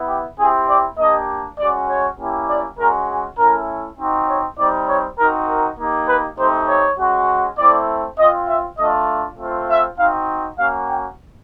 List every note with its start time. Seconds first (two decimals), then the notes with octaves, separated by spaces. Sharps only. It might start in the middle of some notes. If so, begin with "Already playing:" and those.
Already playing: B3 E4
0.08 G4
0.38 C4 E4 G4 G#4
0.68 D5
0.98 A#3 D4 G4 D#5
1.59 G#3 C#4 F#4 D5
1.89 C#5
2.19 A#3 C#4 E4 G4
2.49 D5
2.78 G#3 C#4 F#4 A#4
3.08 G#4
3.38 A3 C#4 E4 A#4
3.98 C4 D#4 F#4
4.29 C#5
4.58 G3 C4 D#4 D5
4.88 C#5
5.18 C4 D#4 F#4 A#4
5.48 A#4
5.78 A#3 D#4 G4
6.08 B4
6.38 A3 C4 D#4 G4 C5
6.68 C#5
6.99 G#3 C#4 F#4
7.58 A3 C4 E4 D5
8.19 C4 F4 D#5
8.49 E5
8.78 A3 D4 F4 D#5
9.38 A3 C4 F4
9.69 E5
9.98 C4 D#4 F#4 F5
10.58 A#3 C#4 F#4 F5
10.89 G5